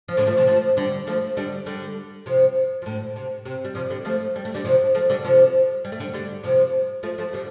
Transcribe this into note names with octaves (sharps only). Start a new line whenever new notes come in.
F3
A2 D3
F3 A3
C3 F3
F3 A3
D3 G3
F3 A3
D3 G3
D3 G3
C3 F3
F3
A2 D3
C3
C3
G3
C3 F3
D3 G3
F3 A3
G3
A3
D3 G3
C3 F3
F3 A3
D3 G3
C3 F3
G3
A3
D3 G3
D3 G3
C3 F3
F3 A3
F3 A3
D3 G3